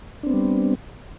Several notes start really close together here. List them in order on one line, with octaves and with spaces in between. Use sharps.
D4 C4 B3 G3